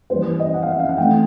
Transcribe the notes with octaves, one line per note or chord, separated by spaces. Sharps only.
E3 G3 A#3 C5
B4
D#5
F#5
F5
E5
F5
F#5
E3 A3 C4 G5